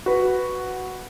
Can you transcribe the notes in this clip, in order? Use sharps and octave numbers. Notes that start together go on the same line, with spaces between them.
F#4 B4